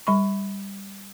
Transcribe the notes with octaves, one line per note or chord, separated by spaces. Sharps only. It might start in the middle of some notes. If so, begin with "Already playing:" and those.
G3 B5 C#6